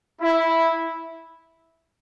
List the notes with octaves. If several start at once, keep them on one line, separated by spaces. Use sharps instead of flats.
E4